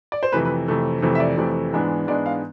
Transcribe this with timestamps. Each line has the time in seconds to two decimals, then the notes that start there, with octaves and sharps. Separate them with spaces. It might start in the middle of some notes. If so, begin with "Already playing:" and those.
0.12 D5
0.23 C5
0.32 F2 C3 E3 A3 B4
0.45 B4
0.68 F2 C3 E3 A3
1.02 F2 C3 E3 A3
1.15 E5
1.20 D5
1.37 F2 C3 E3 A3
1.73 G#2 E3 G#3 B3 D4
2.07 G#2 E3 G#3 B3 D4 D5
2.26 F5